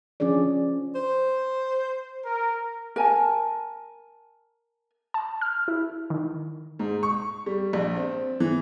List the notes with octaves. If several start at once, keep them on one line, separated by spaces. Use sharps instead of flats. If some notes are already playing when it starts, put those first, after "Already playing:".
F3 C#4 D4 G#4 D5
C5
A#4
A#4 G#5 A5
A5
F6
E4
D#3
G#2
C#6
G3
A#1
C4
E3